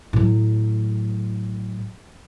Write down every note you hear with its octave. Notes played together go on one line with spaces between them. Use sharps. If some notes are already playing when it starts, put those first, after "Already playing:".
A2 F#3